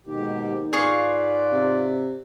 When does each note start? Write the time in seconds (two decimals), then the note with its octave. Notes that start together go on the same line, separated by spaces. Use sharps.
0.07 D#2 G#2 B2 G4
0.73 G#2 F4 G#4 B4 D5 F5 C#6
1.52 C3